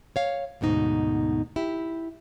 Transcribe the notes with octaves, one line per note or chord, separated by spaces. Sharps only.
C#5 F5
D2 G#2 B2 D#4
E4 G4